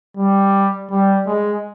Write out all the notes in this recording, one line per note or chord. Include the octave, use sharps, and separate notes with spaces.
G3
G3
G#3